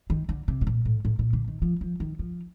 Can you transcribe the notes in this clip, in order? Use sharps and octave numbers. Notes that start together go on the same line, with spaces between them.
D#3
D3
C3
A2
A#2
A2
A2
A#2
D3
D#3
F3
F3
D#3
F3